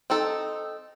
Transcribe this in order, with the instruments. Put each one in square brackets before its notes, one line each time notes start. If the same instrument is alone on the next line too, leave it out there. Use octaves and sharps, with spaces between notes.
[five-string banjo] C4 D#4 A4